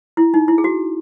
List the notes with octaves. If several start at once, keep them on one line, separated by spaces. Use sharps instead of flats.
E4
D#4
E4
G#4
F#4